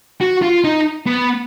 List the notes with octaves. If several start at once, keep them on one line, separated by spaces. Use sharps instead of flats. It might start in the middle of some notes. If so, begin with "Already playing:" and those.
F#4
F4
D#4
B3